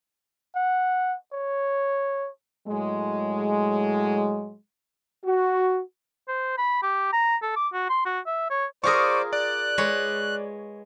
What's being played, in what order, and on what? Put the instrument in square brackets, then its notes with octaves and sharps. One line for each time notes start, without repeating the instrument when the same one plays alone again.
[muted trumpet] F#5
C#5
[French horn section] A2 F#3 G#3
[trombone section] F#4
[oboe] C5
B5
G4
A#5
A4
D6
F#4
C6
F#4
E5
C#5
[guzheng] F4 G#4 A#4 [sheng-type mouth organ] C5 D5 [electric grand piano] C#6 D#6
[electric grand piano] D5 [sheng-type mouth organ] F#6
[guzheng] G#3 B4 C#5